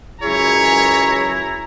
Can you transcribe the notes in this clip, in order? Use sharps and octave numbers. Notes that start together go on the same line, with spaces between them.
C#2 F#2 E4 G#4 C#5 A#5